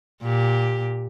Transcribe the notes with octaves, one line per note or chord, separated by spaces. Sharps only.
A#2 G4